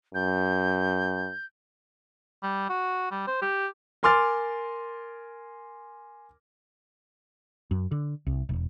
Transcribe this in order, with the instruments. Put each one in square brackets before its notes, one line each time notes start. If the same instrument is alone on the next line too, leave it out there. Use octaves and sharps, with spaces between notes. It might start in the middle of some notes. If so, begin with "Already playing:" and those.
[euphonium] F#2 [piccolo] G6
[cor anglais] G3
F#4
G3
C5
G4
[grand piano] A#4 G#5 C6 D6 F6 A6
[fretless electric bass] F#2
D3
C2
E1